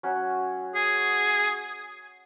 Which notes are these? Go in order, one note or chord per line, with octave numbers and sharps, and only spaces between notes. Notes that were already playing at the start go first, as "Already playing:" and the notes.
F#3 C#4 F#4
G#4